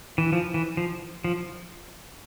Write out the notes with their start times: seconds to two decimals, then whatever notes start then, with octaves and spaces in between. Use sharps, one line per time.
0.18 E3
0.32 F3
0.54 E3
0.77 F3
1.24 F3